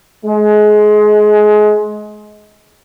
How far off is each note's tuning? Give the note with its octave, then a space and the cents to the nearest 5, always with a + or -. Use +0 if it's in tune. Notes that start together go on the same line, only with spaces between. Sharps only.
G#3 +25